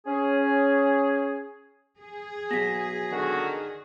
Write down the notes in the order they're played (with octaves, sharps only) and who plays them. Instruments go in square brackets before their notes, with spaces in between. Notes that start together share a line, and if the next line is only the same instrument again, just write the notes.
[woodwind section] C#4 G#4
[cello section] G#4
[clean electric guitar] B2 F#3 [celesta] A#6 B6
[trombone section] D3 D#3 F#4